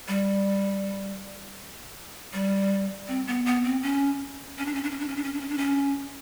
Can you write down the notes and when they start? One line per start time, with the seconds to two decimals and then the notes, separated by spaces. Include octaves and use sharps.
0.08 G3
2.33 G3
3.08 C4
3.27 B3
3.46 B3
3.64 C4
3.83 C#4
4.58 C#4
4.66 D4
4.75 C#4
4.83 D4
4.91 C#4
5.00 D4
5.08 C#4
5.17 D4
5.24 C#4
5.33 D4
5.41 C#4
5.49 D4
5.58 C#4